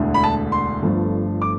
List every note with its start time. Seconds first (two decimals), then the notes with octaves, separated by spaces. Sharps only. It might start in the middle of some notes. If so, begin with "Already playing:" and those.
Already playing: E1 D2 D3 A3
0.14 B5
0.24 A5
0.52 C6
0.82 G1 G2 F3 A3
1.42 D6